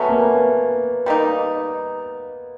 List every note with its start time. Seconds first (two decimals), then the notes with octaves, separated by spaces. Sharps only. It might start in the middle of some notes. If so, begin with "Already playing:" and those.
Already playing: C#3 F#3 A3 B3 C#4
0.09 A#3
0.18 B3
1.06 G3 A#3 D#4